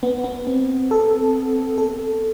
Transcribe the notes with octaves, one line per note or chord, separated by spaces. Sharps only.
B3
B3
C4
A4
A4